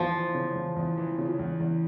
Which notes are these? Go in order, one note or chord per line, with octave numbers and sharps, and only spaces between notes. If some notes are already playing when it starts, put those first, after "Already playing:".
Already playing: E2 F3
E3
C#3
E2
E2
E3
C#3
E2
E2